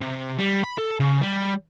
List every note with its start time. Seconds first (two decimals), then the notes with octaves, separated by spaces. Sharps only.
0.01 C3
0.38 G3
0.63 B5
0.78 A4
1.00 C#3
1.22 G3